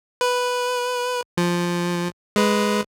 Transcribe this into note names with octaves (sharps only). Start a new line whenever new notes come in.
B4
F3
G#3 B4